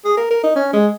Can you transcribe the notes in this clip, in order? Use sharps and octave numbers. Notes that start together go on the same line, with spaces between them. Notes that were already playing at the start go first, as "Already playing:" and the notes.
G#4
A#4
A#4
D#4
C#4
G#3